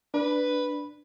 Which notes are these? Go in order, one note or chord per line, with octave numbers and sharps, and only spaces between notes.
D4 B4